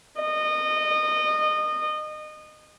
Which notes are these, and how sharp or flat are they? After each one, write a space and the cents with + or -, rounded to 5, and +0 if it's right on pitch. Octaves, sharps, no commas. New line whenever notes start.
D#5 -25